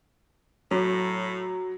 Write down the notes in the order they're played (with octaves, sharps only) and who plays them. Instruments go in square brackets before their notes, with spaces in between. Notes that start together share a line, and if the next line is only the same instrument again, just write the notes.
[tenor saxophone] A2 [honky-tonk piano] F#3